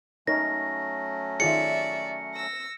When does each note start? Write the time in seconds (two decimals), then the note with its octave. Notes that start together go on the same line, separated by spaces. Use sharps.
0.27 F#3 A3 C#4 D#4 A#4 C#5 A#6
1.40 D#3 F4 G#4 D5 E5 C#7
2.34 E6 A#6